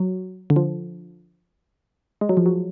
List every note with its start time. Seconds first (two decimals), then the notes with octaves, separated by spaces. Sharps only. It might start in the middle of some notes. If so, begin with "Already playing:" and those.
Already playing: F#3
0.50 D3
0.56 F3
2.21 G#3
2.29 F#3
2.37 F3
2.46 F#3